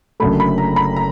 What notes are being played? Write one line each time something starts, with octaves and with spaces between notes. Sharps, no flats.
F#1 F#2 D3 F#3 A3 B5
B5
A#5
B5
A#5